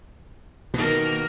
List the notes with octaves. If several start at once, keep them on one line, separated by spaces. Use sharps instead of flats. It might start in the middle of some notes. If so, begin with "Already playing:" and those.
B2 D#3 A#3 A#4